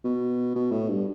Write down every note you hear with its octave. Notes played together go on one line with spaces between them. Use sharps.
B2
B2
A2
G2